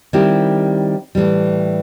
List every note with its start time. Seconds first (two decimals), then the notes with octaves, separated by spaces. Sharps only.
0.13 D#3 G3 C4 E4 G4
1.15 A2 E3 G3